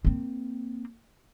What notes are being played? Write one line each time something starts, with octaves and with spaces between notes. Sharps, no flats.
A#3 C4